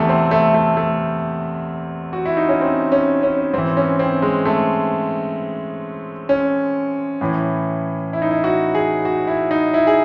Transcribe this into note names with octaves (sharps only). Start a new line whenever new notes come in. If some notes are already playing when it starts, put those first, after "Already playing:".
Already playing: E2 C3 E3 A3
C4
A3
A3
A3
F#4
E4
D#4
C#4
C4
C#4
C#4
G#2 E3 C4
C#4
C4
G#3
A3
C#4
A2 E3
E4
D#4
E4
F#4
G#4
F#4
E4
D#4
E4
G#4